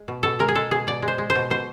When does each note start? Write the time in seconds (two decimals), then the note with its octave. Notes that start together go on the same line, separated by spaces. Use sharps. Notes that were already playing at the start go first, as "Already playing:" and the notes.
Already playing: G#3
0.08 B2
0.23 B2 A4
0.39 G#3 A#4
0.48 G#4
0.55 G#3 A4
0.71 B2 G#4
0.87 B2 D5
1.02 G#3
1.08 C5
1.18 G#3
1.30 C5
1.35 B2
1.50 B2 C5